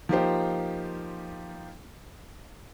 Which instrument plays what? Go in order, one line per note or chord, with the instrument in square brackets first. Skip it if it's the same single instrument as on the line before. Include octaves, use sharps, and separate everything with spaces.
[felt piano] F3 A#3 D#4 F4 G4 C5